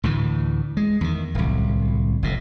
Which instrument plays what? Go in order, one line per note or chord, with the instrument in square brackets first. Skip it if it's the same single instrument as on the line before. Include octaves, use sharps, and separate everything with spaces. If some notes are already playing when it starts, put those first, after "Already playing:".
[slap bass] D2 A2 E3
G#3
E2 D#3
D1 C2
F1 A2